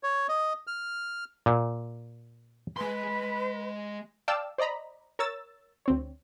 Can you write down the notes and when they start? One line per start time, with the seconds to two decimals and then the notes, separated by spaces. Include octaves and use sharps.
0.03 C#5
0.29 D#5
0.67 F6
1.46 A#2
2.77 G#3 B4 C6
4.28 D5 F5 G5 A5 D6 E6
4.58 C5 D5 D#5 A#5 B5
5.19 A#4 C#5 E6 A6
5.86 D2 C4 C#5